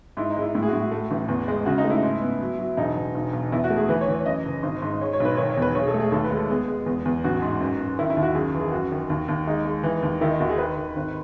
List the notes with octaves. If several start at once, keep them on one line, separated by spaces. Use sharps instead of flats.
G#2 E4
D#4
G#3
E4
A2 E4
G#4
F#4
A2
F#4
A3
A1
E2
G#3
C#3 F#4
D#4
A3
E4
G#2
B3
F#3
F#3
E1 D#4
E1
B1
B1
E2 E4
F#4
A3
G#4
E3 B4
C#5
E3
C#5
F#2 D#5
F#1
G#1
G#2
G#3 C#5
C#5
B1
B4
D#3 C#5
C#5
E2
B4
B1 C#5
G#4
A4
A3
G#4
D#2 A4
B4
G#3
A4
B3 G#4
G#3
E2
E2
A1 F#4
G#2
F#2
F#2
D#3 E4
E4
D#2
F#4
F#2 G#4
E3
G#4
F#2 F#4
D#3
D#2
D#2
G#3 D#4
G#3
E3
D#2
D#3 E4
D#4
D#2 F#4
G#4
D#3 B4
D#3
G#1